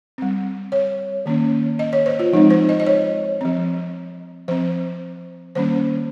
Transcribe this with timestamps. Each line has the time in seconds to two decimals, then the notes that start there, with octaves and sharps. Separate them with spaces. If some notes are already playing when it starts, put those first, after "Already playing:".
0.18 G3 C4
0.72 C#5
1.26 D#3 A#3 C#4
1.79 D#5
1.93 C#5
2.06 C5
2.19 F4
2.33 F3 G#3 C4 D#4
2.50 C5
2.69 D#5
2.80 D#5
2.87 C#5
3.41 F3 C4
4.48 F3 C4 C5
5.55 D#3 G3 A#3 C#4 C5